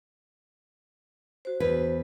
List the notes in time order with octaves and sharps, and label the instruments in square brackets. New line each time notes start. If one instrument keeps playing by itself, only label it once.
[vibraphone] F#4 C5
[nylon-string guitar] E2 B4